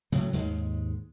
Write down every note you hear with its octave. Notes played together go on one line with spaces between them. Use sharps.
A2 C#3 F#3
D#2 G#2 G#3